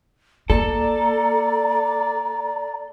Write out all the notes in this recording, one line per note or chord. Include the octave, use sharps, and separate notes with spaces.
A#3 A4 D5 A#5